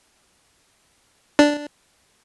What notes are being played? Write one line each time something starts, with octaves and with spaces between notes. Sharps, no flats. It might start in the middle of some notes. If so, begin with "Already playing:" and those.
D4